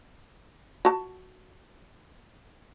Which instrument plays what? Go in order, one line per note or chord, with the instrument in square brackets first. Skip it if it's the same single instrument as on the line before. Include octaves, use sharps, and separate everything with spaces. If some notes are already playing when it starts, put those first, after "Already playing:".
[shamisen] F#4 A5